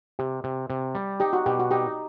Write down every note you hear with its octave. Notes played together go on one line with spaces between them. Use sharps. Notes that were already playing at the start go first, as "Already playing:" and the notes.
C3 G4
C3
C3
G3
D#4 G4
F#4
B2 G4
F#4
D#4 G4